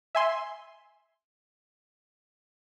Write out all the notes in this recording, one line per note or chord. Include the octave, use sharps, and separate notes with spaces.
E5 G#5 C6